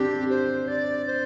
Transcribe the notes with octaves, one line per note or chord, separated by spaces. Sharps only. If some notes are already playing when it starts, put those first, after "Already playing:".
Already playing: C4 D4 G4
C5
D5
C5